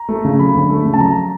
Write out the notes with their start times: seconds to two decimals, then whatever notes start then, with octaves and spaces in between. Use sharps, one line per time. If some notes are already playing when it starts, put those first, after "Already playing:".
Already playing: A#5
0.09 A3
0.25 C#3
0.39 F#3 B5
0.54 D2
0.69 A3
0.85 C#3
0.94 A5
1.00 F#3 A#5